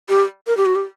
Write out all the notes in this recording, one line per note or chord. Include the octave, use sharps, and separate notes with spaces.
G4
A#4
G4
F#4
G4